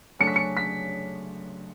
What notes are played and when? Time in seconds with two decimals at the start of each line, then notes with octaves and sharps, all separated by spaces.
0.19 C#3 F#3 A3 D4 A4 C#7
0.27 B6
0.36 C#7
0.57 B6